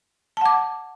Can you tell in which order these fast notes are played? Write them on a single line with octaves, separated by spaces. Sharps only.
A5 F#5 D6